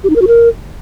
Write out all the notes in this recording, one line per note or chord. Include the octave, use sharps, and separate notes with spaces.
G4
D#4
A#4
F#4
A#4